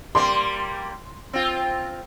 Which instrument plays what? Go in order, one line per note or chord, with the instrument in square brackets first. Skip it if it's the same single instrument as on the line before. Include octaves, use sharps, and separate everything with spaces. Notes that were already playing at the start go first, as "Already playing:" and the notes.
[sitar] G3 A#3 [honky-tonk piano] C6
[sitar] C4 F4